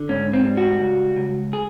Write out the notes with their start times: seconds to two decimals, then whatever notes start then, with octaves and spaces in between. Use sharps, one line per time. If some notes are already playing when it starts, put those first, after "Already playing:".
Already playing: D3
0.09 G#2 C#4
0.33 C4
0.45 G3
0.57 F#4
0.80 C#2
1.16 C#2
1.53 G#4